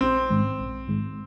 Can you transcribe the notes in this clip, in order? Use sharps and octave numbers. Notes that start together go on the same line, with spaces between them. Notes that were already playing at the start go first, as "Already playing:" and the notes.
A#1 C4
G#2 D#3 G#3
A#1
G#2 D#3 G#3